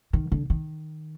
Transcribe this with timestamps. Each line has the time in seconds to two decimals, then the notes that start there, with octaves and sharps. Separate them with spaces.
0.13 D#3
0.32 D3
0.50 D#3